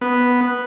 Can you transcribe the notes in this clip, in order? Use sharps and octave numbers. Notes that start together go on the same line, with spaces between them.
B3